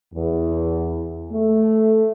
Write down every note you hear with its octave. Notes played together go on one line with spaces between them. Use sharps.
E2
A3